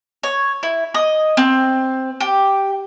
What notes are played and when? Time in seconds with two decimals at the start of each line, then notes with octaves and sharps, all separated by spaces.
0.23 C#5
0.63 E4
0.94 D#5
1.37 C4
2.20 G4